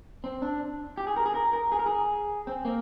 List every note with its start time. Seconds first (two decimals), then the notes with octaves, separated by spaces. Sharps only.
0.24 C4
0.42 D4
0.98 G4
1.07 G#4
1.17 A#4
1.26 G#4
1.35 A#4
1.53 A#4
1.72 G#4
1.79 A#4
1.86 G#4
2.47 C4
2.65 A#3